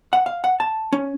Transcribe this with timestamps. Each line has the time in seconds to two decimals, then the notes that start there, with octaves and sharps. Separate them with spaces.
0.13 F#5
0.26 F5
0.44 F#5
0.60 A5
0.93 C#4